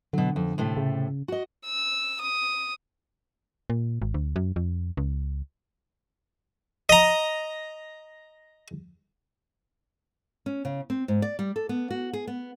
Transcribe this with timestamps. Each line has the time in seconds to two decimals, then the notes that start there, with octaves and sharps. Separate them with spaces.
0.13 B2 D3 F#3
0.36 F2
0.58 A2 C3 A3
0.77 C#3
1.28 F#4 D#5
1.66 E6
2.22 D#6
3.70 A#2
4.02 G#1
4.14 D2
4.36 F#2
4.56 F2
4.97 C#2
6.89 D#5 A#5
10.46 C#4
10.65 C#3
10.90 C4
11.08 G#2
11.22 D5
11.39 G3
11.56 A4
11.69 B3
11.90 F#4
12.13 G#4
12.27 B3